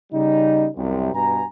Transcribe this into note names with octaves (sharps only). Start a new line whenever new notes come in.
C#3 G3 C#4 D#4
C2 F#2 C3
G2 B2 G#5 A#5